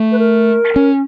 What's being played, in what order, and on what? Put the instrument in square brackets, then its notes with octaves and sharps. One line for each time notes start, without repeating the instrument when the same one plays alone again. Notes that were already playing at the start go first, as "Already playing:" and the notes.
Already playing: [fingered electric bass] A3
[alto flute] B4
A#4
[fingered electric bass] C#4